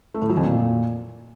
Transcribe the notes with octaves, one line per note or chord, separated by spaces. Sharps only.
A3
A2
F#3
F2
A#2